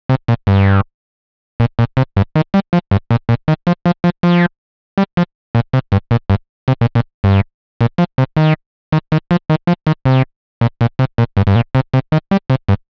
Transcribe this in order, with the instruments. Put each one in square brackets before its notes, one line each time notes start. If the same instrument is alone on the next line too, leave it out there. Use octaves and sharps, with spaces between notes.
[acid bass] C3
A#2
G2
A#2
A#2
C3
G2
D#3
G3
F3
G2
A#2
A#2
D#3
F3
F3
F3
F3
G3
F3
A#2
C3
G2
A#2
G2
C3
A#2
A#2
G2
A#2
F3
C3
D#3
D#3
D#3
F3
D#3
F3
D#3
C3
A#2
A#2
C3
A#2
G2
G2
A#2
C3
C3
D#3
G3
C3
G2